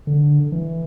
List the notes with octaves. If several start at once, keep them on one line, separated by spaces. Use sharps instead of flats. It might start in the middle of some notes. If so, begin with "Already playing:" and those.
D3
E3